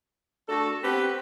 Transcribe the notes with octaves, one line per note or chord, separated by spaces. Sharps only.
A3 D4 F#4 A4
B3 C4 G4 B4